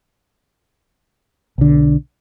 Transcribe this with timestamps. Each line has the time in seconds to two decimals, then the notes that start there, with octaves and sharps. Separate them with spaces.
1.58 B1 D3